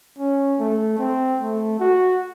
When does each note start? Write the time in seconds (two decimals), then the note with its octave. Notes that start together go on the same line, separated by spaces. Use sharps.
0.19 C#4
0.60 A3
0.99 C4
1.40 A3
1.80 F#4